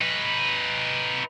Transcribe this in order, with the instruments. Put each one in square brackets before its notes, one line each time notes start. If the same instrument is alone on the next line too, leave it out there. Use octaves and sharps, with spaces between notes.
[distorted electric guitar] D#4 B4